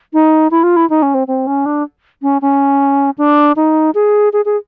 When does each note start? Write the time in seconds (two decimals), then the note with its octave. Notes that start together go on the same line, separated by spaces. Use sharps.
0.13 D#4
0.51 E4
0.63 F4
0.76 E4
0.90 D#4
1.02 C#4
1.14 C4
1.28 C4
1.47 C#4
1.66 D4
2.22 C#4
2.42 C#4
3.18 D4
3.56 D#4
3.95 G#4
4.33 G#4
4.45 G#4